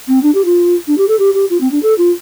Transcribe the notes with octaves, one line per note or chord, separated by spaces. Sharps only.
C4
D4
G4
F4
D4
G4
A4
G4
G4
F4
C4
D4
A4
F4